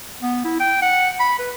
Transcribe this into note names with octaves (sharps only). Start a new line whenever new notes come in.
B3
E4
G5
F#5
B5
B4